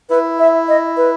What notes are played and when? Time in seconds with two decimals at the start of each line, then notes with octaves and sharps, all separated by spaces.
0.10 E4 B4
0.39 E5
0.68 D#5
0.97 B4